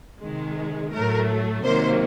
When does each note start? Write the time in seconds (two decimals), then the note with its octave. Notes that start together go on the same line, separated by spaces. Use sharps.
0.21 C3 D#3 G#3
0.92 A2 F#3 A3 A#4
1.64 C3 D#3 F#3 A#3 C5